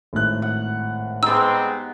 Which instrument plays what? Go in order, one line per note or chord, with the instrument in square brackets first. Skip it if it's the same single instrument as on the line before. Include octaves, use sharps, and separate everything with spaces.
[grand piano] G#1 A2 F#6
[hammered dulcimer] F#5
[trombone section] G3 G#3 C4 [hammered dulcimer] B3 D#4 [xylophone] E6